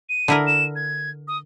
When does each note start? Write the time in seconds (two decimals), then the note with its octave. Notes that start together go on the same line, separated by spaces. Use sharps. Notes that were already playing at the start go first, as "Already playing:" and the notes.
0.09 D#7
0.28 D3 E4 A#4
0.47 E7
0.76 G#6
1.28 D#6